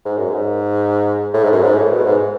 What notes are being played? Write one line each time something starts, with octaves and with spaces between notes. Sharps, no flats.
G#2
F#2
G#2
A2
G#2
F#2
G#2
A2
B2
G#2